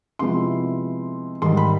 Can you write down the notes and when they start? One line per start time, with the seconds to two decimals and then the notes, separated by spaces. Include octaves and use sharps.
0.19 C3 F3 G#3 B3 E4 C6
1.42 G#2 D#3 G3 C6
1.57 B5